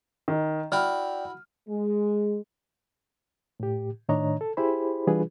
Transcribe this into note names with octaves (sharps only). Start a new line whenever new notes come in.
D#3
E4 F#4 D5 G5 B5 F6
G#3
A2 G4
A2 D#3 D4 C#5 D#5 A#5
A4
E4 G4 G#4 C5 B5
E3 G3 D4 F4 G#4 B4